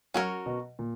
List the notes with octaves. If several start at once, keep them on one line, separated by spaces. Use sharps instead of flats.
F#3 C#4 F#4 A#4 C#5
B2
A#2